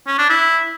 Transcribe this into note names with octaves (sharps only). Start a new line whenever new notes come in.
C#4
D4
E4